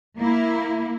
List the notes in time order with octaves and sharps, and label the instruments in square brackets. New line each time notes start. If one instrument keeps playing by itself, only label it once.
[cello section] A#3 E4